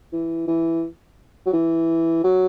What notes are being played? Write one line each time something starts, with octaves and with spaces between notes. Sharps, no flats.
E3
E3
F#3
E3
F#3